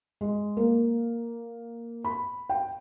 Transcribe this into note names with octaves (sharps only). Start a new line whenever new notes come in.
G#3
A#3
B5
G5